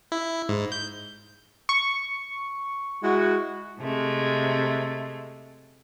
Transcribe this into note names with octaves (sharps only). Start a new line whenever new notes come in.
E4
G#2
G6
C#6
G#3 E4 F#4
C3 G#3 A3